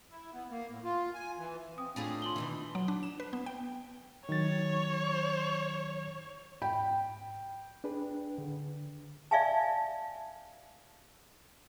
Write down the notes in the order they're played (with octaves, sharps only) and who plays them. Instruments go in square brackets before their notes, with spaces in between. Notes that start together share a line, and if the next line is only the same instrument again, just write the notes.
[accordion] E4
B3
A#3
A2
F4
G#5
E3
[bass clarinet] C4 [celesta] D#6
[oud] A2 F4 G#4 [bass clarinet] D4
[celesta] C6 F#7 G7
[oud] B2 D#3 E3
[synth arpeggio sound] F#3
D4
E7
B4
B3
G5
[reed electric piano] D#3 F#3 A6 [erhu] C#5
[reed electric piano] G#2 B5 [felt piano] G5
[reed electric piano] D4 G#4 B4
D3
[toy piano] D5 E5 F5 G#5 A5